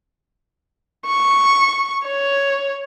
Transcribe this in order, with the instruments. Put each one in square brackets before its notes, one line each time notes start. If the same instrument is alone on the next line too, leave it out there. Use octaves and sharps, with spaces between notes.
[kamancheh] C#6
C#5